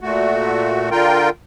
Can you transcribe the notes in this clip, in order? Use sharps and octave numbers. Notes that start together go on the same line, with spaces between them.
A#2 A3 F#4
D3 F4 A#4 G5